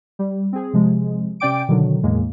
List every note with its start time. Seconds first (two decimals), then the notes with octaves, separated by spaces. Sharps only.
0.19 G3
0.53 C4 G#4
0.73 C3 F3 G#3
1.40 C3 C#4 D5 G5 D6 D7
1.68 B2 D3 D#3 F#3
2.03 E2 A2 E3 G#3 A#3